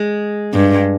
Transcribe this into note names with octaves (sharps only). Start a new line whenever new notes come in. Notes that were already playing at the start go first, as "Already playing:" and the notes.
Already playing: G#3
G2